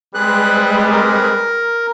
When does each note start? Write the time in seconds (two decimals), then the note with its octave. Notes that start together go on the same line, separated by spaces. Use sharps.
0.15 G3 G#3 C4 G#4 B4 F#6
0.91 A#4